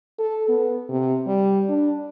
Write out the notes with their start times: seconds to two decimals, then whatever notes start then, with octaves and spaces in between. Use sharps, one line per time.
0.19 A4
0.49 B3
0.89 C3
1.27 G3
1.69 D4